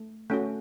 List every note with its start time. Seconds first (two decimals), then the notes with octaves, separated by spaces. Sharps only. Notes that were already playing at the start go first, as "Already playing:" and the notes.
Already playing: A3
0.30 A3 C#4 F#4